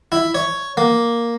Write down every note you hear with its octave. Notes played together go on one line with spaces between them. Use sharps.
E4
C#5
A#3